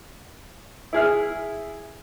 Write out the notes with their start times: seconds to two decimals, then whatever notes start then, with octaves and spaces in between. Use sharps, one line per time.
0.93 E4 G#4 F6